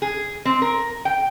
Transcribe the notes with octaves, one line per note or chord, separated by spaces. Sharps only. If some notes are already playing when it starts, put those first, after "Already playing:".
G#4
C4
A#4
G5